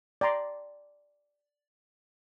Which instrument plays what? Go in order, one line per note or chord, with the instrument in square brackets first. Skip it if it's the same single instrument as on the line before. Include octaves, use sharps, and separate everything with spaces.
[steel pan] D5 G5 A#5 C6